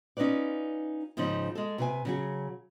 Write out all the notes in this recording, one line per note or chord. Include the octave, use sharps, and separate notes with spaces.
C#4 D#4 F4 B4 D5
G#2 C#3 F3 C#4 D#4
G#3 A4
C3 B4 G#5
C#3 F#3 G#4